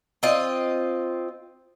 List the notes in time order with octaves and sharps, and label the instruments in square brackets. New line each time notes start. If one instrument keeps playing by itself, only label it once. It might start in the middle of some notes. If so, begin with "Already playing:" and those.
[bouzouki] C4 F4 D#5